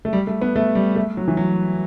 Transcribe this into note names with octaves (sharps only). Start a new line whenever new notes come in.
A3
G3
A3
B3
A3
G3
A3
F#3
E3
F#3